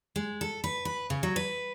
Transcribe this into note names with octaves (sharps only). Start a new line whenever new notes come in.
G#3
A4
B4
B4
C#3
F#3
B4